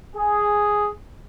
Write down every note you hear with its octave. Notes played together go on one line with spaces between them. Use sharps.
G#4